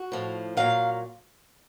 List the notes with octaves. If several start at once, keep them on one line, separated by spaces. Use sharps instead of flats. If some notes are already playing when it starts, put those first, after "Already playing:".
Already playing: F#4
A2 F3
A#2 F#3 F5